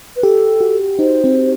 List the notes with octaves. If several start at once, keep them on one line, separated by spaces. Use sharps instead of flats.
B4
G4 A4
F#4
D#4 C5
C4